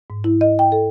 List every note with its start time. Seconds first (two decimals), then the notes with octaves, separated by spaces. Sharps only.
0.10 G#2
0.24 E4
0.41 D#5
0.59 G5
0.72 A4